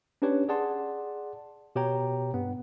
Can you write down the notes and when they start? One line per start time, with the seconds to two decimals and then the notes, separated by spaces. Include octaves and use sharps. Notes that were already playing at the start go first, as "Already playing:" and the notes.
0.22 C#4 D4 G4 B4 C#5
0.49 G#4 D5 F#5 A5 C6
1.76 B2 G4 C#5 G5 A#5
2.33 G2 B3